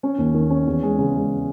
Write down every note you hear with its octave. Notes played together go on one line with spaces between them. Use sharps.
C#4
D#2
D#3
C#4
E2
G#3
C#3
G#3